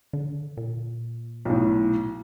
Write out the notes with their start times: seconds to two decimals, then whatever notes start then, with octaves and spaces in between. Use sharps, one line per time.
0.13 D3
0.57 A#2
1.45 B1 A2